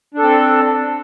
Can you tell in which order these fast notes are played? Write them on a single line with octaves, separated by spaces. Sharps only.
D4 A4 C4